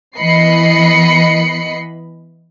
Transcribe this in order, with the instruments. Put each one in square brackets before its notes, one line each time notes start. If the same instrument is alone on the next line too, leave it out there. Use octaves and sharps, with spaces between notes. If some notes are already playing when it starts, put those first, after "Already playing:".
[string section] E3 B3 D#5 B5 C7 C#7